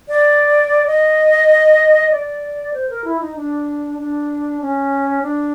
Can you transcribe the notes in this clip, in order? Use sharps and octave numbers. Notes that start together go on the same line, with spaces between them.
D5
D#5
D5
C5
A#4
E4
D#4
D4
D4
C#4
D4